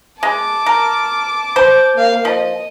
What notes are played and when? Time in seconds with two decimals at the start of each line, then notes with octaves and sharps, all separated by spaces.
0.23 G#3 A5 D6
0.66 A#4
1.56 C5
1.94 A#3 F5
2.25 F3 D#5